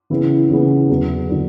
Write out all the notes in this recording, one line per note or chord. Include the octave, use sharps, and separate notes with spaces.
C#3 E3 B3 E4
C#3 E3 B3 E4
E2 D3 F#3
D3 F#3